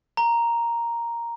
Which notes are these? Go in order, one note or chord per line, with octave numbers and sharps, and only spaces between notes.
A#5